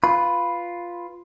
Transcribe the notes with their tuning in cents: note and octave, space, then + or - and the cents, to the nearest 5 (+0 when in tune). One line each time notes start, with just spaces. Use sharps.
F4 +0 B4 +0 B5 +0